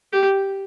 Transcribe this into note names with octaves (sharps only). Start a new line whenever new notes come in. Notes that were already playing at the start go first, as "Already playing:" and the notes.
G4